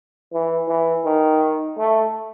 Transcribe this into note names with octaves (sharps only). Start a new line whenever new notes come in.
E3
E3
D#3
A3